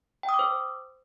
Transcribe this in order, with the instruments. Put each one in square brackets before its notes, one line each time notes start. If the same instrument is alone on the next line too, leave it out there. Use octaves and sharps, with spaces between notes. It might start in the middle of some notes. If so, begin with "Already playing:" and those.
[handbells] G5
D#6
D6
C5